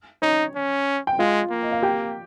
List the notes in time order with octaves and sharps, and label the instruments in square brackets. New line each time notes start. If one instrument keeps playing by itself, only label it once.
[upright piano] C#4 C#5 [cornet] D#4
[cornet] C#4
[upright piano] G5
[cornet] G#3 [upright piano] F4 F5
[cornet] A#3
[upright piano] D#5
F5
G4 G5